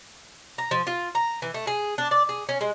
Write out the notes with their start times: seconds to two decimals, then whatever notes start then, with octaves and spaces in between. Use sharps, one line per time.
0.58 A#5
0.71 F3
0.87 F4
1.15 A#5
1.42 E3
1.54 A3
1.67 G#4
1.98 D4
2.11 D5
2.29 G#4
2.49 C#4
2.61 G#3